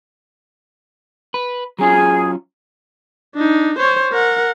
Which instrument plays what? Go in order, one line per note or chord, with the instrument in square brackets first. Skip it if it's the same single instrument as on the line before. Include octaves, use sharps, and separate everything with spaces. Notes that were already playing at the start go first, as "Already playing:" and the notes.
[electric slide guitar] B4
[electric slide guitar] F#3 C#4 F4 [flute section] G#4
[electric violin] D4 D#4
C5 C#5
A#4 F#5